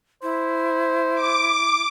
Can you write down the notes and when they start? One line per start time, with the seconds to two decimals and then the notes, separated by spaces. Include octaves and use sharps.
0.23 E4 C5
1.15 D6